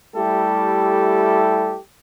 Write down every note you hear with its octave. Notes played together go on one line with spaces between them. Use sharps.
G3 A3 E4 G4 A4